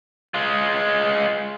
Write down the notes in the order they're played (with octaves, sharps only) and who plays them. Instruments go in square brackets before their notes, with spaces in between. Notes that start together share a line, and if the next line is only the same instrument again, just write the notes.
[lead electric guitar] G#3 F4